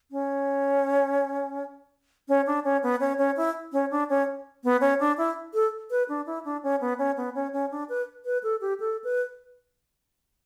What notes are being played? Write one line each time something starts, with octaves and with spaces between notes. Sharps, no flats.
C#4
C#4
D4
C#4
B3
C#4
C#4
E4
C#4
D4
C#4
B3
C#4
D4
E4
A4
B4
D4
E4
D4
C#4
B3
C#4
B3
C#4
C#4
D4
B4
B4
A4
G4
A4
B4